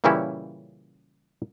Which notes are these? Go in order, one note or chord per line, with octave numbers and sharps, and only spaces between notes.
A#2 C#3 E3 G3 C#4 E4